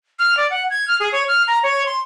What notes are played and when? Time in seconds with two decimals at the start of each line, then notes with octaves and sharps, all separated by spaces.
0.19 F6
0.37 D5
0.50 F#5
0.70 G#6
0.88 F6
1.00 G#4
1.12 C#5
1.28 F6
1.48 A#5
1.63 C#5
1.86 C6